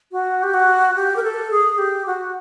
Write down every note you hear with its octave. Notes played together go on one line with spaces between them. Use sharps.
F#4
G4
F#4
G4
A#4
A4
G#4
G4
F#4